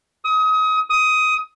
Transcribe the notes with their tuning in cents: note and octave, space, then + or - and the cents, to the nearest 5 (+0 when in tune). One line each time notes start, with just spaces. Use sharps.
D#6 +30
D#6 +15